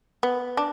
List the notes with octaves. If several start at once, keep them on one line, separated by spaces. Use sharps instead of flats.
B3
D4